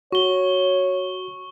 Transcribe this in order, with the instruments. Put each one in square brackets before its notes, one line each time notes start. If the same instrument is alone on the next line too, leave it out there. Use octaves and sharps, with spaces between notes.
[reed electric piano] F#4 [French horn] C#5 [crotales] C#6 G7